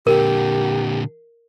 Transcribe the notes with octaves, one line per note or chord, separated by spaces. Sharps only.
A#2 D3 G4 A#4